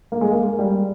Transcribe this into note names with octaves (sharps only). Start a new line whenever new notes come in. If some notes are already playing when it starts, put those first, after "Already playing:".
A#3
G#3
A#3
G3